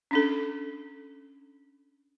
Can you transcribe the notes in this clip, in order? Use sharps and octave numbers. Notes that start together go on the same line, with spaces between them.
C#4 D4 A4